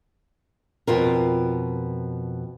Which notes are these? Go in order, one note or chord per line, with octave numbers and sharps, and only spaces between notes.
F2 B2 F4 A#4